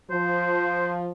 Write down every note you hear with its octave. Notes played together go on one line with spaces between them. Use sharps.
F3 C5